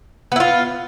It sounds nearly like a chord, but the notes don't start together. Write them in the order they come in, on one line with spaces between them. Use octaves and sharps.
B3 E4 F4